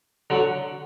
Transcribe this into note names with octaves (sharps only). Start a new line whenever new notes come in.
D3 F#3